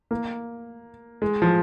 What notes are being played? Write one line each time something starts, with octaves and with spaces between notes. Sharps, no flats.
A#3
G#3
F3